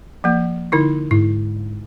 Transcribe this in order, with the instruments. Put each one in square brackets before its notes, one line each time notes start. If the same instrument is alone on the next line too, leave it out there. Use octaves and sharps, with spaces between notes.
[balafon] F3 A#3
D3 D#4 E4
[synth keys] G#2 [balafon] E4